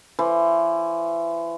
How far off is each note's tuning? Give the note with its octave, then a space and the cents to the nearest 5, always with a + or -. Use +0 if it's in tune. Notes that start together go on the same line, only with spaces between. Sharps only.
E3 +30 C5 +30